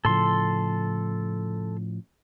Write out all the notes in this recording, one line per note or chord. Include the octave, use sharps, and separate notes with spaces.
A2 C#3 F3 A4 C6